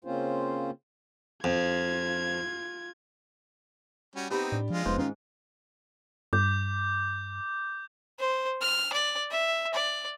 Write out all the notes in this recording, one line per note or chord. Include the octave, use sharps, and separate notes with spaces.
C#3 A#3 C4 C#4 F4 C5
F2 F4 G#6
G3 C#4 F#4
B3 C4 D#4 G4 B5
A2 D4
F3 G#3 F4
E1 F2 G#2 B3 C5
D#3 C#4 F4
G2 D6 G6
C5
F6
D5
E5
D5